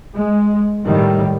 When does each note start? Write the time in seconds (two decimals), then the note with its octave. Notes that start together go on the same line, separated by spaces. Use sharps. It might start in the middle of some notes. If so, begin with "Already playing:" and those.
0.15 G#3
0.85 A2 D#3 G3